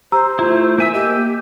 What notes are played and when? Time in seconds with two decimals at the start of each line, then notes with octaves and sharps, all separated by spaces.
0.12 G4 C5 A#5 E6
0.39 A3 E4 F4
0.78 A#3 E5 G#5 E6
0.94 G4 D#5